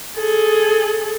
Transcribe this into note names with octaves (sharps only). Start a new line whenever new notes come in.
G#4 A4